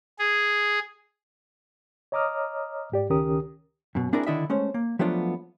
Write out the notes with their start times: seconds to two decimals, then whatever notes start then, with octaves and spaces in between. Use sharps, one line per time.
0.19 G#4
2.12 C#5 D#5 A#5 D6 D#6 F6
2.92 G#2 G4 D5
3.09 C#2 D#3 C#4 G4 A#4 D#6
3.95 F#2 B2
4.13 C4 D4 E4 G#4 A#4 B4
4.27 D3 D#3 D4 E4 D#5 E5
4.50 G#3 A3 C#4 C5
4.74 A#3
4.99 F3 F#3 A3 B3 D4 F4